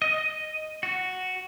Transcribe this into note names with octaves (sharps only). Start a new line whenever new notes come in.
D#5
F#4